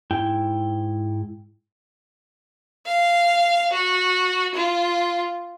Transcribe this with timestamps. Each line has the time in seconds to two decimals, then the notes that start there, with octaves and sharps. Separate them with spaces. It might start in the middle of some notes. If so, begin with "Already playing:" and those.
0.11 G#2 E4 G5
2.86 F5
3.72 F#4
4.55 F4